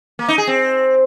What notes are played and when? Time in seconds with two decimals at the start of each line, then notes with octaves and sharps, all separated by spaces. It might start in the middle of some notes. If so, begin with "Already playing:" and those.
0.19 A#3
0.28 D#4
0.38 G#4
0.47 C4